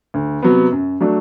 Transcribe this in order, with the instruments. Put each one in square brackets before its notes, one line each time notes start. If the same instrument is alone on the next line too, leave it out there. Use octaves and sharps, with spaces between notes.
[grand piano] D2
C3 F#3 B3
F#2
F#3 A3 D4